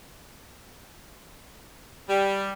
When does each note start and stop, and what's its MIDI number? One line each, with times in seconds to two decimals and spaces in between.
2.10 2.52 55